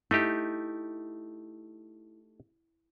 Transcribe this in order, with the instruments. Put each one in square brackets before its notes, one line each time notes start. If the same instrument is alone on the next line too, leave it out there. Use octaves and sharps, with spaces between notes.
[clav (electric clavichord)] A3 D#4 G4 [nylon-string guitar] E4